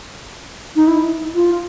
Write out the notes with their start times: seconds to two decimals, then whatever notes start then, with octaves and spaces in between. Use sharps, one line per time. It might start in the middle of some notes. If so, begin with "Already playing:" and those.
0.76 D#4
0.87 E4
1.35 F4